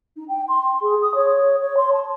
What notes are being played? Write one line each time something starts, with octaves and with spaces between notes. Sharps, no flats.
D#4
G5
C6
G#4
D#6
C#5
C#5
C6
A5